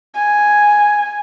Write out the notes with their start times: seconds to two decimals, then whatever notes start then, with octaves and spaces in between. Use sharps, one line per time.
0.15 G#5